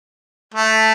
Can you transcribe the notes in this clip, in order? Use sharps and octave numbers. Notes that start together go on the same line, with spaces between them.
A3